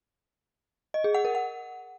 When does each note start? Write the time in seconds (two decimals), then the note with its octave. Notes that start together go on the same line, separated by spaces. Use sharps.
0.94 D#5
1.04 G#4
1.14 F#5
1.25 A#4
1.35 F#5